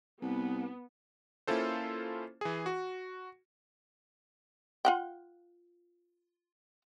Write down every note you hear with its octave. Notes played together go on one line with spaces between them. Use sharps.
C2 B3
A#3 C#4 E4 F4 A4 C5
E3 G#4
F#4
F4 F#5 G5